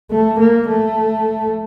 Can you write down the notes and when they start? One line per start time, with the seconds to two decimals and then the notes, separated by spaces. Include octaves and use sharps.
0.10 A3
0.39 A#3
0.69 A3